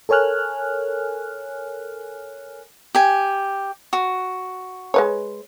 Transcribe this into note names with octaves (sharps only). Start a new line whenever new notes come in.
A4 A#4 C#5 G#5 F6 F#6
G4 G#5
F#4
G#3 B4 C#5